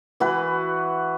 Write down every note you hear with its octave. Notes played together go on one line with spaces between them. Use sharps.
E3 F#4 B4